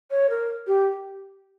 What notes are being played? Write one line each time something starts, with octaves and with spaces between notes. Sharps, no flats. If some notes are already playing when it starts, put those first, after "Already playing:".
C#5
A#4
G4